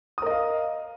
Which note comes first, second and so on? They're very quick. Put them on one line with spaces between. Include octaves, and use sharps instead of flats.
D#6 A#4 D#5 F5